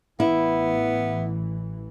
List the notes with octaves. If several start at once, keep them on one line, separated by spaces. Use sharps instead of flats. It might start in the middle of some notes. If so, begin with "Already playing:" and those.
A1 E3 B3 E4